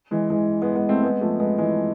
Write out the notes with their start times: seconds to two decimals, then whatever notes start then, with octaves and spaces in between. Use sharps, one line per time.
0.11 E3 G#3
0.30 E3 G#3
0.62 G#3 B3
0.75 G#3 B3
0.89 A3 C4
1.03 G#3 B3
1.21 F3 A3
1.40 G#3 B3
1.58 E3 G#3